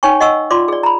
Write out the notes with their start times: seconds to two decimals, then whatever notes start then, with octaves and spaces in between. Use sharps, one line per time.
0.03 D#4 C#5 G5 G#5 C#6
0.20 D#5 F#5 C#6 E6
0.51 F4 D5 C6 D6
0.68 G#4 D5
0.83 A#5 B5